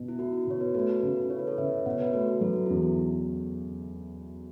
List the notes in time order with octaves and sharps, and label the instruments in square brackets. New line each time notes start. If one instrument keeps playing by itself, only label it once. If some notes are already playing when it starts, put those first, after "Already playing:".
Already playing: [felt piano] B2
[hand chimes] E4
[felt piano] E4 [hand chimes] F#4
[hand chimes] F#4
[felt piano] B2 [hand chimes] C#5
[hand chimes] F#4 B4
[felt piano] A3 [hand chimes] F#4 B4
[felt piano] C#3
[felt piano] E4 [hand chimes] C#5
[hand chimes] B4
A4 C#5
[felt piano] C#3 [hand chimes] B4 E5
[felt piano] B2 [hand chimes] C#5 F#5
[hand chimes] B4 E5
[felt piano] A3 [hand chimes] F#4 B4
[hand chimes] F#4 B4
[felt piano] F#3 [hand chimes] A4
[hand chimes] F#4
[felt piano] E2 [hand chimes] E4 A4